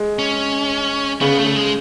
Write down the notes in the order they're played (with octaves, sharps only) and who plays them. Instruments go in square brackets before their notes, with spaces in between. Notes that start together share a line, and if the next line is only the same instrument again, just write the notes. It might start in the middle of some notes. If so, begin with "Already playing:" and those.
Already playing: [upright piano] G#3
[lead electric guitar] C#4
[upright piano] C#3 [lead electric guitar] B3
[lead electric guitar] A3
[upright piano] C#3
[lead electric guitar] G#3